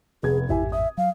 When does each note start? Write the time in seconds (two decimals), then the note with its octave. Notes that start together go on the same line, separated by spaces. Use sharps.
0.23 F1 B3 G#4 G#6
0.49 A1 F2 G#2 E4 G4 E5 G#5
0.72 E5 D#6
0.97 F#3 F5